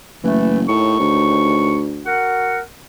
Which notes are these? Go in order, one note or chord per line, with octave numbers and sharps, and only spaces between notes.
F#1 E3 A3
D#2 A2 D#4 C#6
D2
F#4 A#4 F#5